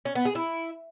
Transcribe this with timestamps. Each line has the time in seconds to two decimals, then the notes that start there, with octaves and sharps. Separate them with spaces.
0.05 C#4
0.15 B3
0.25 G#4
0.35 E4